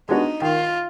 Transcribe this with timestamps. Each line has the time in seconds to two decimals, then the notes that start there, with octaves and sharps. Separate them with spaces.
0.09 G#3 B3 D4 D#4 F#4
0.42 D#3 F4